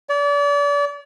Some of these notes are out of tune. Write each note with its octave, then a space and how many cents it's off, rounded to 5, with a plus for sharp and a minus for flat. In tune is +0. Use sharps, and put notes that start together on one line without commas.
D5 -35